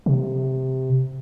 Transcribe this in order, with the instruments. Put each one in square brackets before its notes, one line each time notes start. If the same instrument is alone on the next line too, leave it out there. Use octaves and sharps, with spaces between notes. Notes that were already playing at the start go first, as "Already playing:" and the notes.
[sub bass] C3